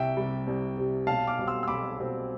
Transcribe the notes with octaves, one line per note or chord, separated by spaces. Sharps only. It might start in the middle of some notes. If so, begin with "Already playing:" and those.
Already playing: C2 E5 G5
C3 G3
C2
C3 G3
B1 F5 A5
D6 F6
B2 G3 C4
C6 E6
E6
B1 B5 D6
B2 G3 C4